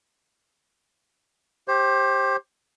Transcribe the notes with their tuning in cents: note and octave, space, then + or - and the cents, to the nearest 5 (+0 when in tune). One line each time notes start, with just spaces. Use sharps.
G4 +0 C5 +25